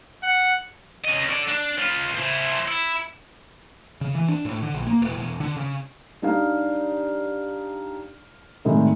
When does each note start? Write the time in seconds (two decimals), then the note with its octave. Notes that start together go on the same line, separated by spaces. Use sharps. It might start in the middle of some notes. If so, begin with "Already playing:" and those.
0.23 F#5
1.04 C#4 D#5
1.29 A4 D5
1.48 D4
1.78 C#3 F4
2.15 E4 C5
2.68 E4
4.01 C#3
4.15 E3
4.29 D4
4.45 A2
4.63 D3
4.74 A#1
4.87 A#3
5.02 E1
5.16 E1
5.40 D3
5.57 C#3
6.22 G3 D4 D#4 G4 D5 F5
8.65 A2 C3 D#3 G3 G#3